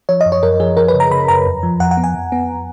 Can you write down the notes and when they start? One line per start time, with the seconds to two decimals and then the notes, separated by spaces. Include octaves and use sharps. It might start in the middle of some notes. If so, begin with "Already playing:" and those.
0.09 F3 C#5
0.21 F#2 D#5
0.32 C#5
0.43 F#2 A#4
0.60 F3 G#4
0.77 F3 A#4
0.88 B4
0.94 C#3
1.00 A#5
1.11 C#3 B5
1.28 F#2 A#5
1.46 F2
1.63 F3
1.80 F2 F#5
1.91 F#5
1.97 B3
2.04 G#5
2.15 F2
2.32 B3